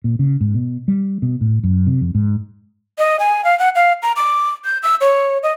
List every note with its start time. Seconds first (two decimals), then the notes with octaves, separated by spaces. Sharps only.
0.04 A#2
0.19 C#3
0.41 G#2
0.54 B2
0.88 G3
1.22 B2
1.41 A2
1.64 F#2
1.87 C3
2.01 F2
2.15 G#2
2.98 D#5
3.19 G#5
3.45 F5
3.59 F#5
3.75 F5
4.03 A#5
4.16 D6
4.65 G6
4.83 E6
5.01 C#5
5.43 D#5